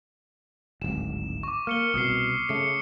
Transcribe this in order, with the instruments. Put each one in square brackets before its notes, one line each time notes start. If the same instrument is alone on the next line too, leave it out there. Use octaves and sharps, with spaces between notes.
[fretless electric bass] D1 G#1 [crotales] E7
[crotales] C#6 D6
[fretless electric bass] A#3 [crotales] F6 C#7 G7
[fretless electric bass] C2 B2 [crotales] D#6 F6 C7
[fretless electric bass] C#3 A3 [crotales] C#7